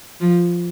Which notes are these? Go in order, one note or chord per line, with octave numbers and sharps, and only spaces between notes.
F3